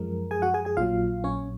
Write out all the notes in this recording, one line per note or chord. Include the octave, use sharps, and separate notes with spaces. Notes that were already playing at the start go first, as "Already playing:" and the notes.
Already playing: F#2 F3 G#3 A#4
G#4 G#5
F#4 F#5
G#4 G#5
G#4 G#5
A#1 A#2 F#3 F4 F5
C#4 C#5